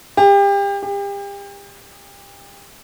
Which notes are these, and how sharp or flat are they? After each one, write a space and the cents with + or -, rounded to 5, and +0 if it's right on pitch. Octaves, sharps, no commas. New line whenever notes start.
G4 +30
G4 +35